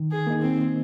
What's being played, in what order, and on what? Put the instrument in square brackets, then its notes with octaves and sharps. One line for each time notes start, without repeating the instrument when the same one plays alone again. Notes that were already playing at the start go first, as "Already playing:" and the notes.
Already playing: [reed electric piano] D#3
[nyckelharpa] G#4
[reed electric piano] A#3 D#4
[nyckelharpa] C4